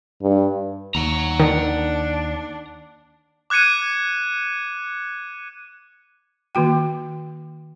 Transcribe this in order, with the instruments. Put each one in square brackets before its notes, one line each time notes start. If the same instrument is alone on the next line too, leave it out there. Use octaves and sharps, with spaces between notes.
[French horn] G2
[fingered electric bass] D#2 [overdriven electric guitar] F#5 A#5
[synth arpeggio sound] D#3 [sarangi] D4
[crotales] D6 F#6 G#6 C#7 D#7
[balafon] D#3 A#3 F#4 G5